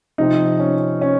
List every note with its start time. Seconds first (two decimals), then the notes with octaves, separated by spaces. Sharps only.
0.18 C3 F3 C4 D#4
0.60 C#4
1.01 C#4